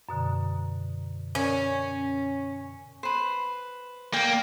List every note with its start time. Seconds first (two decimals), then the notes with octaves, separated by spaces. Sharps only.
0.09 F#2 B2 D3
1.35 C#4 A#4
3.03 B4 C5
4.13 A#3 D5 G5